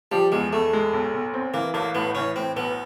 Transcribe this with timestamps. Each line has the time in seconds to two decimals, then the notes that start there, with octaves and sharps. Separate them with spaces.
0.11 F3 G3
0.32 E2 G#3
0.52 E2 A3
0.73 G#3
0.93 B1
1.13 B1
1.34 C4
1.54 E3 A#3
1.74 A1 A#3
1.95 A2 B3
2.15 E3 C#4
2.36 A2 C4
2.56 B1 B3